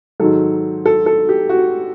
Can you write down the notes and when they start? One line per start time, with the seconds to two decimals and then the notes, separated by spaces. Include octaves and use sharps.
0.20 G#2 D#3 F#3 A4
0.85 A4
1.06 A4
1.29 G4
1.49 F#4